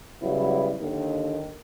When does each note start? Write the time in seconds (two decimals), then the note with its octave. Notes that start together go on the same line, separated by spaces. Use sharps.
0.22 C#3 F#3 G3 B3 E4
0.81 D#2 D3 D#3